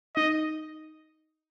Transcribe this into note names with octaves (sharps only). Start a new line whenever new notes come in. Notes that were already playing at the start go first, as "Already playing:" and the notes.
D#4 D#5